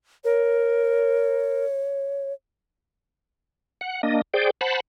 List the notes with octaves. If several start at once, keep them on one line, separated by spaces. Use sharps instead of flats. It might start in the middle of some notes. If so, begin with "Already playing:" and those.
A#4 C#5
F#5
A#3 D4 D#5
G#4 C5 D5 G5
C5 F#5 A5 B5